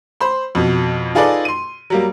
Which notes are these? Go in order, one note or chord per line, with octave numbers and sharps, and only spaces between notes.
C5 B5 C6
F2 B2
D#4 F4 G#4 A4 B4 D5
C6 D#7
F#3 G3 A#3